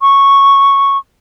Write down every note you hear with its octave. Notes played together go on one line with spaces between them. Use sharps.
C#6